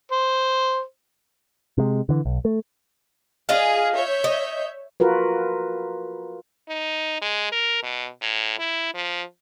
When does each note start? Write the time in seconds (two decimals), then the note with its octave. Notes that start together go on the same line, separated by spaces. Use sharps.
0.12 C5
1.78 C3 G#3
2.09 D3 E3
2.25 B1
2.45 A3
3.49 F4 G#4 D#5 F5
3.93 C#5 E5 G6
4.24 D#5
5.00 F4 F#4 A#4 B4
6.69 D#4
7.22 G#3
7.52 A#4
7.83 B2
8.22 A2
8.59 E4
8.94 F3